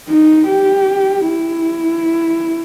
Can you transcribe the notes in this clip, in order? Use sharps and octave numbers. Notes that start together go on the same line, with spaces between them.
D#4
G4
E4